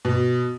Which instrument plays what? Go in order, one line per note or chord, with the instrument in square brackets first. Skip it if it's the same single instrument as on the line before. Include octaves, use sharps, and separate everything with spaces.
[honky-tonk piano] B2